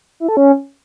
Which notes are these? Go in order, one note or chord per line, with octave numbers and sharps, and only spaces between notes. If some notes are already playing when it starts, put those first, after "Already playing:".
E4
A4
C#4